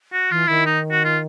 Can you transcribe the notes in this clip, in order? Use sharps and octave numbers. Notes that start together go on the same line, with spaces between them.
F#4
E3 F4
D#3 E4
D#4
F#4
F4